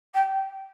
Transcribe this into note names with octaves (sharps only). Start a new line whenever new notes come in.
G5